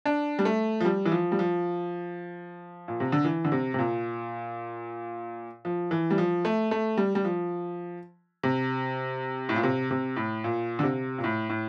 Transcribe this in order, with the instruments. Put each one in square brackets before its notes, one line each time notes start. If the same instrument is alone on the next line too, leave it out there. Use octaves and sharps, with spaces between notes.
[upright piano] D4
G3
A3
F3
G3
E3
F3
G3
F3
A#2
C3
D3
E3
D3
C3
C3
A#2
F3
E3
G3
F3
A3
A3
G3
G3
F3
C3
A2
A#2
C3
C3
A2
A#2
D3
C3
A#2
A2
A2